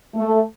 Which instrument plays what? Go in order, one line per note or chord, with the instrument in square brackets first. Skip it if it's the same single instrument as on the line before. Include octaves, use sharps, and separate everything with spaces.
[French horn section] A3